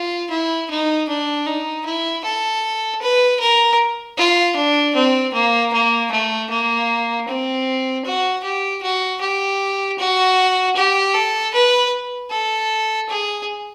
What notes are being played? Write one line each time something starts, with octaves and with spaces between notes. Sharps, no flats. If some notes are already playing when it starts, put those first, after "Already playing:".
Already playing: F4
E4
D#4
D4
D#4
E4
A4
B4
A#4
F4
D4
C4
A#3
A#3
A3
A#3
C4
F#4
G4
F#4
G4
F#4
G4
A4
B4
A4
G#4